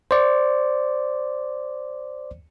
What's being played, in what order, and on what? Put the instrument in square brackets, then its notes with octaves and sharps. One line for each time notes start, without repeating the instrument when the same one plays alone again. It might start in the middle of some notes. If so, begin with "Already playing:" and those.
[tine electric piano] C5 D5